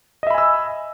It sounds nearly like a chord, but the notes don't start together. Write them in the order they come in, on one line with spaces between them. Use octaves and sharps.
D#5 E5 B5 G#5 E6